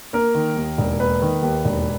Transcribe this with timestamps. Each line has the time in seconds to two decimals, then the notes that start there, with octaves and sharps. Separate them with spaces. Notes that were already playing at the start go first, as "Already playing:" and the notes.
0.13 A#3 A#4
0.35 D#3
0.56 D#2
0.78 E1
0.99 A#3 B4
1.22 D#3
1.42 D#2
1.65 E1